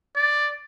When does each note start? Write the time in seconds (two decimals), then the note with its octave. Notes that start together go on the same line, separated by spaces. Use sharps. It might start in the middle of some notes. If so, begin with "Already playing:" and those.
0.16 D5